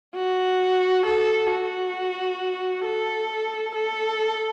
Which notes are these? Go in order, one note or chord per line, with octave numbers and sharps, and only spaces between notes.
F#4
A4
F#4
A4
A4